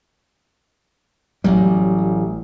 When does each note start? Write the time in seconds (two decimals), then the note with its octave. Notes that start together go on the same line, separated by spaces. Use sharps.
1.44 A1 F#3 G3